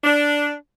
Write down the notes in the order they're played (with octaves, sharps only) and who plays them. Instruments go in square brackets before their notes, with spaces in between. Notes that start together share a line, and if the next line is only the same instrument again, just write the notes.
[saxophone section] D4